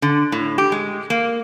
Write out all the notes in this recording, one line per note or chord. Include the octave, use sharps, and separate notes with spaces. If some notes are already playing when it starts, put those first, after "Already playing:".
D3
A2
G4
G#3
A#3